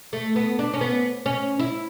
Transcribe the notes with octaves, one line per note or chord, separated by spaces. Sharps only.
A3
B3
D4
C#4
B3
C#4
E4